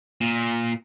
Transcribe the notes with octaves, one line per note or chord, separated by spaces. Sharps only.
A#2